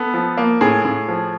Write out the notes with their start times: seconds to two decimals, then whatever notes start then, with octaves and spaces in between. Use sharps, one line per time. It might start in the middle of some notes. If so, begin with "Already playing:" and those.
Already playing: B3 A4
0.14 F3
0.37 A#3
0.61 A2 G#4
0.85 A2
1.08 F3